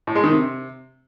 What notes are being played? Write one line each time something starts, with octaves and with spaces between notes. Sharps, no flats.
A2
G#3
D#3
C3